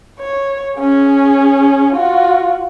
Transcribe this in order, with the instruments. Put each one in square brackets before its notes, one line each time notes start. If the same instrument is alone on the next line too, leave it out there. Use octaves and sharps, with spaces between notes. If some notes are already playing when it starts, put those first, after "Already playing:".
[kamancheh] C#5
C#4 G#4
F4 F#4